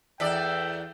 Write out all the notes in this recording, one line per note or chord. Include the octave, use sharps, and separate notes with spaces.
E2 A4 D5 E5 G5